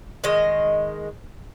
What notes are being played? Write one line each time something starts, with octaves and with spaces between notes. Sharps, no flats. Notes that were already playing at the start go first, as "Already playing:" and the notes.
D#3 G#3 D#5